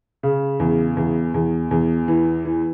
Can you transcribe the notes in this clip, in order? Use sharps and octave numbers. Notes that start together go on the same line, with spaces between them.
C#3
E2
E2
E2
E2
E3
E3